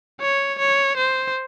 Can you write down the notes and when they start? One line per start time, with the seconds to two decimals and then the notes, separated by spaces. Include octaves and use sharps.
0.21 C#5
0.59 C#5
0.97 C5